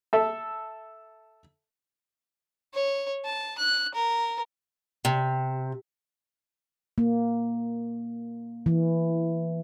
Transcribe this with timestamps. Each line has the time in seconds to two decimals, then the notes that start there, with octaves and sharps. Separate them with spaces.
0.13 A4 E5
2.74 C#5
3.25 A5
3.58 F#6
3.94 A#4
5.05 C3
6.98 A#3
8.66 E3